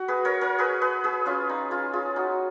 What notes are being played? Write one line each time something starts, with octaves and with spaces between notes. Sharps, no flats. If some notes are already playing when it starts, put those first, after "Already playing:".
Already playing: F#4
G#4 B4
A#4 C#5
A#4 C#5
G#4 B4
G#4 B4
G#4 B4
C#4 F4
D#4
F4 G#4
F4 G#4
D#4 F#4